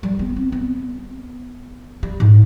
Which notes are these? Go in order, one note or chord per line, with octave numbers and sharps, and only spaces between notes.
G3
B3
C4
B3
G3
G#2